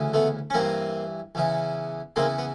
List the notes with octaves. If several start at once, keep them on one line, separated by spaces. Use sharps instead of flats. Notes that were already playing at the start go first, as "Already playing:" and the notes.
Already playing: D2 C#3 E3
A3 B3
C#4
G2 E3 A#3 C4
E2 C#3 E3
E2 C#3 E3 A#3 C4
B3